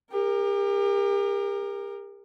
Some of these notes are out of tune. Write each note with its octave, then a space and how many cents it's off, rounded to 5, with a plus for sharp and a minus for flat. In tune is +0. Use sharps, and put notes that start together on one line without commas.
G4 +40 A#4 +0